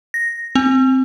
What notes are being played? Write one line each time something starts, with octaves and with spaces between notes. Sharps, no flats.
A#6
C4